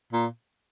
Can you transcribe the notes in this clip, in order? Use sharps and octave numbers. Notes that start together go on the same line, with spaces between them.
A#2